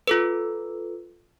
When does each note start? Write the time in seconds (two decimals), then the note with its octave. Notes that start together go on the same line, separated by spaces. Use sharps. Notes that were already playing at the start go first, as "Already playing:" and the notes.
0.07 F4 A4 B4